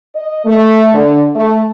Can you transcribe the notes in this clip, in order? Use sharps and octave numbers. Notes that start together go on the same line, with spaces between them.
D#5
A3
D3
A3